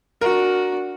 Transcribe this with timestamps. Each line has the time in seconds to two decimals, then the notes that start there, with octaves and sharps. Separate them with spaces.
0.21 D4 F#4 A#4